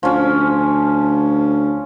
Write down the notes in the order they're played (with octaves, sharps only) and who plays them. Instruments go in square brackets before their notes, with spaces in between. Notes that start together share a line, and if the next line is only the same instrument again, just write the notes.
[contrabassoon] D2 [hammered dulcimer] F3 C#4